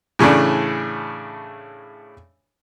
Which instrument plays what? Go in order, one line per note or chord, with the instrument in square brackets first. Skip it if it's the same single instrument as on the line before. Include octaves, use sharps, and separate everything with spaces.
[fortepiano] A2 C#3 E3 A3 D4